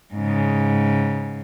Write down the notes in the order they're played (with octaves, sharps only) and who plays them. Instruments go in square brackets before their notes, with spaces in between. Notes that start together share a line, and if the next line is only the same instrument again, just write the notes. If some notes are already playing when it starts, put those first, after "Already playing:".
[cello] G#2 C#3